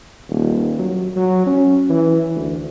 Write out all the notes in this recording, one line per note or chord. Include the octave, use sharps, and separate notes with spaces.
D#1
F#3
F#3
C#4
E3
D2